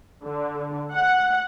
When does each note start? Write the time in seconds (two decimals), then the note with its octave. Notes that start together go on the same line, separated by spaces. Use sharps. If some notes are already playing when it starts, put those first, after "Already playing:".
0.24 D3
0.92 F#5